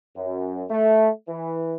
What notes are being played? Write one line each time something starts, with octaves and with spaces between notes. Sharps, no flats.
F#2
A3
E3